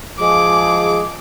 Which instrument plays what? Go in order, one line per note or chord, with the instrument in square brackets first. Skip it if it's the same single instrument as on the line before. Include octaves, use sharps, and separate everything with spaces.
[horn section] F3 G#3 G#4 [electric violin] D6